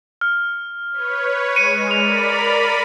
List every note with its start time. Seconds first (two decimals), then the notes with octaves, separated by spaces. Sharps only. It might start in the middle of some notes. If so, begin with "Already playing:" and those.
0.21 F6
0.92 B4 C#5
1.56 G#3 C#7 D#7
1.91 A#4 D5 B5 F7